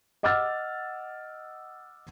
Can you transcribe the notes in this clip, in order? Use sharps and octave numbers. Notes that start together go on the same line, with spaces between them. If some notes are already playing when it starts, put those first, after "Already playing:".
D#5 F#5 D6 E6 F6 A6